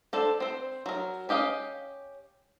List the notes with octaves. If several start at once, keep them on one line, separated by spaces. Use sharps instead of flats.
D4 A4 C5
C4 C5
F#3 A#4
C#4 G4 D#5 F5